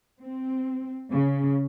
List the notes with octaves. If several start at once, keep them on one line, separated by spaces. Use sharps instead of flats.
C4
C#3